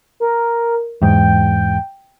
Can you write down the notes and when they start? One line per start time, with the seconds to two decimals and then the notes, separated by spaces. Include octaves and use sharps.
0.20 A#4
1.02 E2 G#2 G5